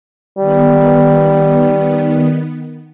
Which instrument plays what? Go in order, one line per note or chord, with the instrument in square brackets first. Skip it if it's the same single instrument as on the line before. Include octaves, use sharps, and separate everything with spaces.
[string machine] D#3 B3 [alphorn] G3